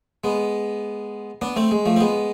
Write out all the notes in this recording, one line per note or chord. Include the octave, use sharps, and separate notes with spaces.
G#3 B3
B3 D4
A3 C4
G#3
F3 A3
C4
G#3 B3